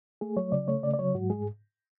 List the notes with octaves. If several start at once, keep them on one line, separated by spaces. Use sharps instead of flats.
A3 G#4
F#3 C#5
C#3 D5
A3 C#5
C#3 D5
D5
F#3 C#5
G#2 F#4
G#3 G#4